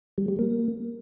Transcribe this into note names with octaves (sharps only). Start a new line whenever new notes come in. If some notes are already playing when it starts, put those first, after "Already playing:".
G3
G3
A#3